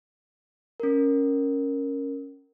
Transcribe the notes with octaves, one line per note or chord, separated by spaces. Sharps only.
C#4 A#4